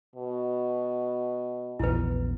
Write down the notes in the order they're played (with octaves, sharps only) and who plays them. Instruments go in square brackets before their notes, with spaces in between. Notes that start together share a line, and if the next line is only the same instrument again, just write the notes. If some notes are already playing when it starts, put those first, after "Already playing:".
[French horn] B2
[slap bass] A#1 E2 B3 [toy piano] E4 B4